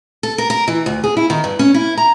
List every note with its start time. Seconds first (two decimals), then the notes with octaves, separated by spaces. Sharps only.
0.23 A4
0.38 A#4
0.50 A#4
0.68 E3
0.86 D2
1.04 G#4
1.17 E4
1.30 D#3
1.44 G2
1.59 C#4
1.74 E4
1.98 A#5